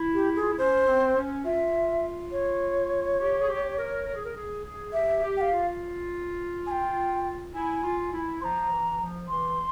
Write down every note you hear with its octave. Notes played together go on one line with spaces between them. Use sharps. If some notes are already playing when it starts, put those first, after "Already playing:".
Already playing: E4
G4
G#4
F4
E4
C#4 C5
C4
C#4
F4 E5
C#5
G4
G#4
G4
A#4
A#4
G#4
A#4
G#4
G#4
G4 E5
G4
G5
F5
F4
G#5
G5
E4 G#5
F4
E4
F3 A#5 C6
E3
F3
E3 C6